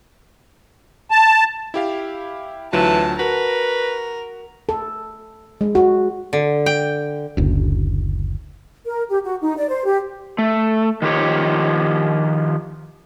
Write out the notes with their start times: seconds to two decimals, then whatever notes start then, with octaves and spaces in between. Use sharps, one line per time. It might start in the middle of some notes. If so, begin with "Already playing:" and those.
1.11 A5
1.74 E4 G4 F5
2.73 D2 E3 F#3 F4 A5
3.19 F#4 A#4 B4
4.69 A4
5.61 G#3
5.75 F#4
6.33 D3
6.66 G5
7.37 F#1 D2
8.86 A#4
9.09 G4
9.24 F#4
9.41 D#4
9.58 D5
9.70 C5
9.85 G4
10.38 A3
11.02 D#3 F3 G4 C#5